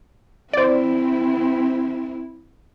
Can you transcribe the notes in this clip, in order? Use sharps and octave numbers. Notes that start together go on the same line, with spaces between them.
C4 E4 C5 D5